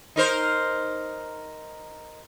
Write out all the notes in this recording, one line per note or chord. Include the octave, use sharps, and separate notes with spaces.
D#4 A#4 C5